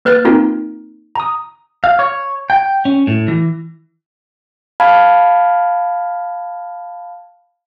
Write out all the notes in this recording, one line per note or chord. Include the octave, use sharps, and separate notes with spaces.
A#3 B4 F6 F#6 A6
A#3 C4 D#4 F4 A#4
A#5 D#6
F5
C#5
G5
C#4
A2
E3
F5 A5 B5 F6 G#6